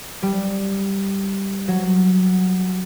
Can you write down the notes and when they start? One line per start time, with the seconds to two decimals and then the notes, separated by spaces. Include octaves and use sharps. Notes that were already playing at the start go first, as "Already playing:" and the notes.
0.22 G3
1.68 F#3